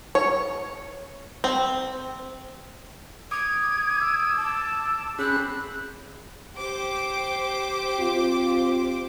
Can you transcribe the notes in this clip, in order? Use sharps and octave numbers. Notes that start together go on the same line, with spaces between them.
C#5
C4
D6 D#6 G#6
E6
A5 D6
C4 C#4 G#4 B5 F#6
G4 C5 D6
C4 F4